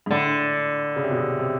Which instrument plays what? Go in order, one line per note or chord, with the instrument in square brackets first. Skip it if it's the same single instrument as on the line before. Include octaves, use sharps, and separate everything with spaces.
[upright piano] G#2
[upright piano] A2 [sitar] D3
[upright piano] C#3
C3
B2
C3
C3